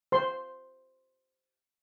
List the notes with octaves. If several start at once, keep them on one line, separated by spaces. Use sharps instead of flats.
C5 C6